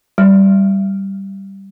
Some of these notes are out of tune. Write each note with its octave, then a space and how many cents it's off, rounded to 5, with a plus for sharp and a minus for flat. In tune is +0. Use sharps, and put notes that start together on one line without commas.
G3 -5